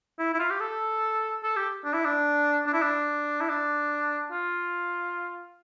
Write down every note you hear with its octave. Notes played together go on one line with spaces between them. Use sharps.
E4
E4
F4
G4
A4
A4
G4
D4
E4
D4
D4
E4
D4
E4
D4
F4